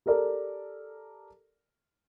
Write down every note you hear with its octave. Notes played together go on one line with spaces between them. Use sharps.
G4 A4 A#4 D5